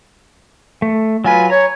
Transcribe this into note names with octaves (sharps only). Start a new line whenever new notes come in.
A3
F#3 F4 B4 G#5
C#5 A#5